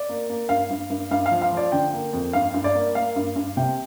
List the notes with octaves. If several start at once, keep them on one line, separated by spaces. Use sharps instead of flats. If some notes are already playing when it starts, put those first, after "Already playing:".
Already playing: D5
A#3
A#3
G2 F5
G2
G2
G2 F5
F5
F3
F5
F3 D5
D3 G5
A#3
F2
G2 F5
G2
D5
A#3
A#3 F5
G2
G2
C3 G5